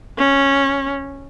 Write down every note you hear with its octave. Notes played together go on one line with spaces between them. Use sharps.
C#4